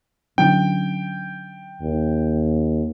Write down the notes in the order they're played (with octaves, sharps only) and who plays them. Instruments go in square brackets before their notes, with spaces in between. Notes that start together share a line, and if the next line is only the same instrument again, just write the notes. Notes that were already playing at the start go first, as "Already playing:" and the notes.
[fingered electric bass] D3 F#3 C#4 [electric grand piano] G5
[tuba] D#2